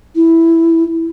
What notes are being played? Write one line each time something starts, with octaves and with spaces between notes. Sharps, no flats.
E4